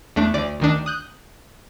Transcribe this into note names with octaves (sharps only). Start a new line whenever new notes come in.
E2 A3 D4
D2 D5
D2 D#3 D4
D#6 F#6 G6